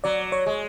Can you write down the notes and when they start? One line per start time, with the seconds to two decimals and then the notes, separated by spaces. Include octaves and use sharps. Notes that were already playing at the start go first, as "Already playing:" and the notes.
0.04 F#3 D5
0.32 C#5
0.46 G#3